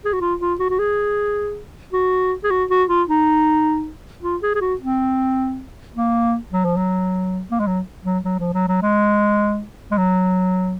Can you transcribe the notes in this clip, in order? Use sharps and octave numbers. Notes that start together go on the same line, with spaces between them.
G#4
F#4
F4
F4
F#4
F#4
G#4
F#4
G#4
F#4
F#4
F4
D#4
F4
G#4
G#4
F#4
C4
A#3
F#3
F3
F#3
A#3
G#3
F#3
F#3
F#3
F3
F#3
F#3
G#3
G#3
F#3